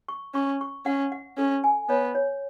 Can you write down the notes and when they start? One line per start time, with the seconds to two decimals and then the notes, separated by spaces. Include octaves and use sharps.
0.08 C#6
0.34 C#4 C#6
0.61 C#6
0.86 C#4 F#5
1.12 F#5
1.38 C#4 A4
1.64 G#5
1.90 B3 C#5
2.15 C#5